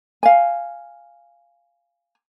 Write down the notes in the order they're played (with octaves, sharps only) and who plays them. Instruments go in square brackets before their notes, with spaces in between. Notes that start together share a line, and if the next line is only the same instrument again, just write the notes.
[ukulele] F5 G#5